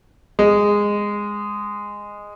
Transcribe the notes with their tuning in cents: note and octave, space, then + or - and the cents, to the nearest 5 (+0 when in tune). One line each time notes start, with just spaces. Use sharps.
G#3 -10